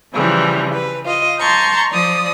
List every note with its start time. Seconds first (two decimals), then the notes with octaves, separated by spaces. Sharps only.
0.13 C#3 E3 F3 G3
0.73 B4
1.05 F4 D#5
1.39 A5 A#5 C6 C#6 G6
1.91 F3 D5 D#6